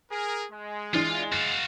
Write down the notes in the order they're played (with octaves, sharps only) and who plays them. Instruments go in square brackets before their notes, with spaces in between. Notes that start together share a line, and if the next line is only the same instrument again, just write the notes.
[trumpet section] G#4 A#4
G#3
[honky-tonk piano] E3 D4 F7 [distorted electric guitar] F4
[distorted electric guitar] F#4 F5 [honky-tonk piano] A6